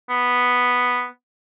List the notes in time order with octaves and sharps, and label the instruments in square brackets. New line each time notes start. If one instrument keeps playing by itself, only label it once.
[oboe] B3